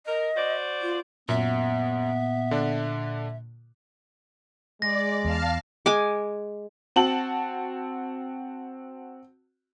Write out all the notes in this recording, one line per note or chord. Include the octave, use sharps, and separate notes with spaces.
A#4 D#5
F#4 C5 D5
F4
F#2 A#2 B3 E5
D3 D4
G#3 D5 A#6
E2 F5 A5 F6
G#3 G#5 D6
C4 F#4 A5 F#7